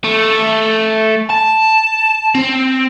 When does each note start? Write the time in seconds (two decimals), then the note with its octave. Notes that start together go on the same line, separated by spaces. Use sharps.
0.04 A3
1.30 A5
2.35 C4